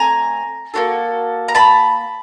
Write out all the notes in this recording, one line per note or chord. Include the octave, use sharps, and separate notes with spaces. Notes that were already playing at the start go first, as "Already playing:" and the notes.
Already playing: A3 C4 G#5 A#5
A#3 D4 F#4 A4
A#5
A5 B5